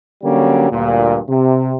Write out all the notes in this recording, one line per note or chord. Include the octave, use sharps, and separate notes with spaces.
D3 F#3 G3 A#3 C#4
D2 G2 A#2
C3